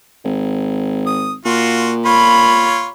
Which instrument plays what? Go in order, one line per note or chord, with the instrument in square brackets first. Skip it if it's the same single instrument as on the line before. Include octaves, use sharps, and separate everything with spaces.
[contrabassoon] G#1
[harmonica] D#6
[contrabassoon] A#2 [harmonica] F4 F#4
[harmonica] F4 C#5 [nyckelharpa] B5